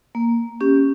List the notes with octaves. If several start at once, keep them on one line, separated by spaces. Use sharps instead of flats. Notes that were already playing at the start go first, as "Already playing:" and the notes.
A#3
C#4 G4